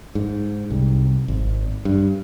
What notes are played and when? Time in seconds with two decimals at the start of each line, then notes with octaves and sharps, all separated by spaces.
0.15 G#2
0.71 C2
1.28 G#1
1.85 G2